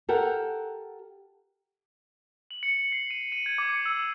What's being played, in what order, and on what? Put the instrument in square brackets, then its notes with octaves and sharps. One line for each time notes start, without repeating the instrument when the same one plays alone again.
[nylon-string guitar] G4 A4 A#4 F#5
[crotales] F#7
C#7
C#7
C7
D#7
D#7
G#6
D6
C#7
E6